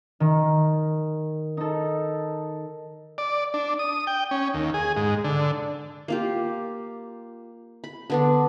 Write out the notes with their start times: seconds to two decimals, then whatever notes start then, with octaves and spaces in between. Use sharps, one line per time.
0.20 D#3
1.57 D#4 A4
3.18 D5
3.54 D4
3.79 D#6
4.07 G5
4.31 C#4
4.54 D#2
4.74 G#4
4.96 G#2
5.24 D3
6.08 A#3 F4 G4
7.84 B5
8.10 D3 B3 D4